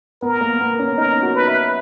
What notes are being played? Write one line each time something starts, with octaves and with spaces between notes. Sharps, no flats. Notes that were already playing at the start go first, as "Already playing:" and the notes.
B3 A#4
A#3
B3
C#4
D#4 A#4
F#4
B4
E5